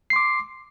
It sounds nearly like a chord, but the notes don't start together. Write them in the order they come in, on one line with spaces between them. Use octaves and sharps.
C7 C6 D6